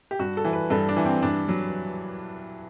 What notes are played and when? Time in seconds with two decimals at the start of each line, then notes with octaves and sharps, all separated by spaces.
0.11 G4
0.19 G2 F#4
0.37 A4
0.45 E3
0.53 B4
0.70 G2 A4
0.89 D4
0.97 E3
1.05 C4
1.23 G2 D4
1.48 F#3